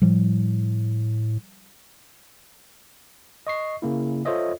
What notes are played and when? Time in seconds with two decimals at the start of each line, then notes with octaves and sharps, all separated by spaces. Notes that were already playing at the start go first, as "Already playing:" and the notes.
0.02 A2 F3 G3
3.47 D#5 C#6 C7
3.82 C#3 A#3 E4
4.25 F4 A4 C5 C#5 D#5 E5